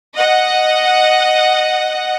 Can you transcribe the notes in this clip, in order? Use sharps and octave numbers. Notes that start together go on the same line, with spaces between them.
D#5 F#5